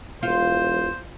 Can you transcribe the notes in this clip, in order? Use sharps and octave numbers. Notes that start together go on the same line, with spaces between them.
E1 F4 C5